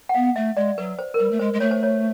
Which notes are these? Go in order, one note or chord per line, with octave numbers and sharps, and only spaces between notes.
F#5
B3 F5
A3 E5
G#3 D5
F#3 B4
C5
A#4
G3 B4
A3
G#3 C5
G#3
A3 C#5
C5
C#5